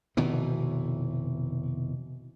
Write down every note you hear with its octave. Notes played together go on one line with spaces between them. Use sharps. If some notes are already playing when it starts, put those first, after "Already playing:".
F1 B2 D#3 E3